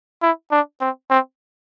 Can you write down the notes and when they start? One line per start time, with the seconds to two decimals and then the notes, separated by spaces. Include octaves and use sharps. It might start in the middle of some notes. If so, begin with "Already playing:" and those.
0.22 E4
0.51 D4
0.81 C4
1.10 C4